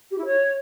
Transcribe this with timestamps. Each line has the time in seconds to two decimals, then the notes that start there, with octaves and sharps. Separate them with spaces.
0.11 G4
0.18 E4
0.25 C#5